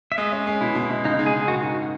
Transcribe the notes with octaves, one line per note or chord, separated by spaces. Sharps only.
E5
G#3 D#5
C#4
G#3
B2 E4
B2
B2
C#3 D#4
G#3
G#4
C#3
D#3 F#4
G#2
F#4